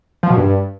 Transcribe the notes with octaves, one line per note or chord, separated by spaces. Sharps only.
F3
B2
G2